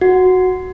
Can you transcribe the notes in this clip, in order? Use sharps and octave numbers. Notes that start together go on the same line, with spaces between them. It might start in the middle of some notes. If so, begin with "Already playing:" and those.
F#4